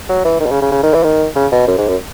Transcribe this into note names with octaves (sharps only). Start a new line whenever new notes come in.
F#3
E3
D#3
B2
C#3
C#3
C#3
D#3
E3
D#3
C#3
B2
F#2
G#2
F#2